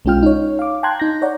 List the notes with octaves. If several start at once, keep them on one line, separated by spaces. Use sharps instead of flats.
B1 G#3 C#4 F4 G5 F6
D#4 C#5
F5 D6
G5 A5 A#5 C6 F#6 G#6
D#4 G6 A#6
C#5 D5 F#5 A#5